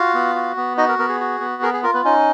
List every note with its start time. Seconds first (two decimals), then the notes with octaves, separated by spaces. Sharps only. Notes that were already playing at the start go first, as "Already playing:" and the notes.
Already playing: F4 F#4 F5
0.14 B3
0.35 F#4
0.57 B3
0.77 D#4 F#4 D#5
0.88 A#4
0.99 B3 A#4
1.09 G#4
1.20 F#4
1.40 B3
1.62 G#4 A#4
1.73 G#4
1.83 F4 A#4
1.94 B3 B4
2.05 C#4 D#4 D#5